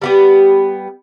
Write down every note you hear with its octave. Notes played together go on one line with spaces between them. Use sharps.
G3 B3 G4